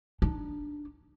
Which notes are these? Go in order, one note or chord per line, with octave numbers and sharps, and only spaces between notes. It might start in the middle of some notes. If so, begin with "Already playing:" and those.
D4 D#4